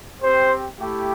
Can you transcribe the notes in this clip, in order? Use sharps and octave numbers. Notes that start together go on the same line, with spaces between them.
C4 G4 C5
A3 E4 G4